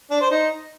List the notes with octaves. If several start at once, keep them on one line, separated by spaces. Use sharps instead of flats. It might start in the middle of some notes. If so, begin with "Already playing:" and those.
D4
C5
D#4